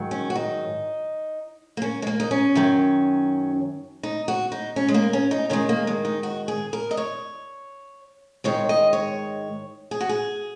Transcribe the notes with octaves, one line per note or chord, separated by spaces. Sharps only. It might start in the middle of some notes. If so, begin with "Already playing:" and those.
Already playing: G#2 D#3 F#3
C#4
F#4
D#4
A#3
C#4
G#3
A#3
D#4
C#4
F#2 D#3 F#3
D#4
F#4
D#4
C#4
G#3
A#3
C#4
D#4
G#2 D#3 G#3 C#4
A#3
G#3
D#4
F#4
G#4
A#4
D#5
C#5
G#2 D#3 G#3 C#5
D#5
C#5
G#4
F#4
G#4